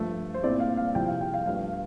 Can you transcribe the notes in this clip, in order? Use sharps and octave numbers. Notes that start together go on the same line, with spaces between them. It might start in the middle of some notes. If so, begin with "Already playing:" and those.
Already playing: G2 F3 A3
C5
A#2 A3 C4 E4 D5
F5
F5
C3 F3 C4 E4 G5
F5
G5
F5
G2 F3 A3 F5